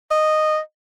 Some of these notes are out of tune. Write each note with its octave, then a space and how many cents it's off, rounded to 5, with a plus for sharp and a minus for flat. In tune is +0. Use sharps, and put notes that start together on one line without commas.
D#5 -10